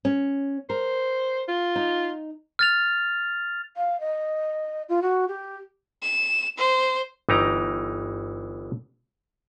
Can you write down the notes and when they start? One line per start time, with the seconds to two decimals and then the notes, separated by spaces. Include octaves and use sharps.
0.05 C#4
0.70 A#4 C5
1.49 F4
1.76 D#4
2.59 F6 A6 F7
3.76 F5
4.00 D#5
4.89 F4
5.02 F#4
5.28 G4
6.02 E7
6.58 C5
7.29 G1 E3 D#4 G4 A#5